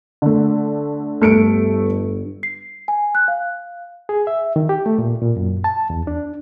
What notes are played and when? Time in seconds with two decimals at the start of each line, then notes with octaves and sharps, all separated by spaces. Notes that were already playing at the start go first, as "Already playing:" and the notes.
0.22 D3 A3
1.22 G1 G2 A3 C#7 D7
2.43 C7
2.88 G#5
3.15 F#6
3.28 F5
4.09 G#4
4.27 E5
4.56 D#3
4.69 G4
4.86 A3
4.99 A#2
5.22 A#2
5.37 F#2
5.64 A5
5.90 E2
6.07 D4